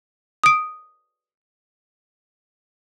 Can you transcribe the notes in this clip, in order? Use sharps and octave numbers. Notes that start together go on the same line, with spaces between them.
D#6 D7